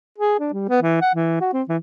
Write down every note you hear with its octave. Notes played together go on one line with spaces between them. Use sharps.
G#4
D4
G3
B3
E3
F#5
E3
F#4
C4
E3